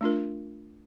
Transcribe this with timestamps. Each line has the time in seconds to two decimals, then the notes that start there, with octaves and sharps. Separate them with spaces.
0.01 A3 D4 F4 A#4